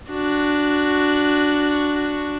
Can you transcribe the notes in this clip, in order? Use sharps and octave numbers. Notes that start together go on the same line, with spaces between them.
D4 F#4